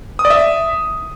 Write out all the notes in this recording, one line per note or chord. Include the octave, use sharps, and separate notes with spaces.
D#6
D5
E5